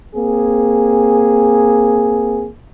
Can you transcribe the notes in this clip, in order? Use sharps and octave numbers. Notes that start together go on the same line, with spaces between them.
A#3 C4 G#4